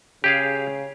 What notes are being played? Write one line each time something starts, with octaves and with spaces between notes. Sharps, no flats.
C#3 G4 G#4 F5